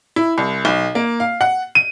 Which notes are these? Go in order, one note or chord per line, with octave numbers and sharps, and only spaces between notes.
E4
C2
B1
A#3
F5
F#5
D#7